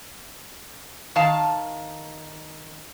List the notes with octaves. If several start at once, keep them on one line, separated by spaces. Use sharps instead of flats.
D#3 F5 A5